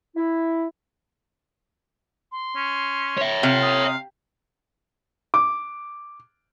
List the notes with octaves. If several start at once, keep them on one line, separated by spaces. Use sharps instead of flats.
E4
C6
C#4
C#5 E5
C3 F5
D#6
D6